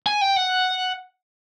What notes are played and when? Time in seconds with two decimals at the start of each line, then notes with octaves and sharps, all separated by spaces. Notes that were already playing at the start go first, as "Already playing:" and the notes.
0.06 G#5
0.21 G5
0.36 F#5